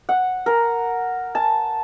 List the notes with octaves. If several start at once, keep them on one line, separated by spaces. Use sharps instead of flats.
F#5
A#4
A5